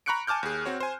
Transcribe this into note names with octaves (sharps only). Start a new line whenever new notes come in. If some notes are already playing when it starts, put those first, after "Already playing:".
A#5 B5 C#6 F#6 C#7 D7
G#5 A5 D6 F6 G6
D#2 G#4
C4 F#4 C#5
C5 G#5